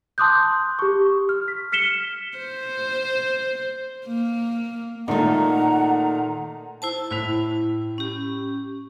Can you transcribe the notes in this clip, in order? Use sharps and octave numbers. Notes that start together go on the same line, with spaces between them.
A5 C6 D6 D#6 F#6 G6
G4 C#6
F6
B6
F6 B6 C#7 E7 G7
C5
A#3
A#2 D#3 A3 D#4 F#5 A#5
E4 C5 A5
A2 E4 B6 F7
C#4 G4